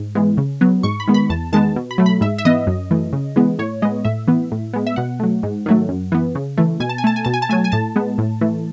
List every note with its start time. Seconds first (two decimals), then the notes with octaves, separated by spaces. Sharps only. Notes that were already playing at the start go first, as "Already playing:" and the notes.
Already playing: G#2
0.15 E3 G#3 B3
0.37 C#3
0.61 F#3 B3
0.83 G#2 C#6
1.00 B5
1.07 D#3 G#3 B3
1.14 B5
1.30 E2 A5
1.53 D#3 G#3 B3 A5
1.76 B2
1.91 B5
1.98 F#3 A3
2.06 B5
2.21 G#2 E5
2.38 E5
2.45 E3 B3 D#5
2.67 F#2
2.91 E3 A3
3.13 C#3
3.36 E3 G#3 B3
3.59 A2 C#5
3.82 G#3 B3 D#5
4.05 A2 E5
4.28 E3 B3
4.52 A2
4.73 G#3 B3
4.87 E5
4.96 B2 F#5
5.20 F#3 A3
5.43 G#2
5.66 D#3 F#3 A3
5.89 F#2
6.12 E3 B3
6.35 C#3
6.57 E3 A3
6.80 B2 G#5
6.89 A5
6.98 G#5
7.04 A3 A5
7.16 G#5
7.25 B2 A5
7.34 G#5
7.42 A5
7.49 F#3 A3 G#5
7.64 G#5
7.72 A2 A5
7.96 G#3 B3
8.18 A2
8.41 E3 A3